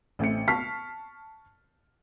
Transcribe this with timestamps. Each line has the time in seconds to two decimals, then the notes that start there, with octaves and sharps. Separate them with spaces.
0.19 A1 A3 C4 C#7
0.48 A5 C#6 F6 B6 C7